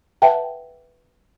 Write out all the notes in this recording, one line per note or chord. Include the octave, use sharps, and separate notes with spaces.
B4 E5 F#5 G5 A5